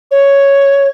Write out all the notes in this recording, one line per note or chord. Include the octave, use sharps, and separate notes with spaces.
C#5